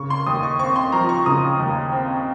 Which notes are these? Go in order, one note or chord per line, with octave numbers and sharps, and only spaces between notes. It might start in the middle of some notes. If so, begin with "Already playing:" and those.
Already playing: C#3 C#6
C6
D#2 D#6
C#6
C4 C#6
C6
F3 A#5
C#6
C#3 D#6
D#2
C4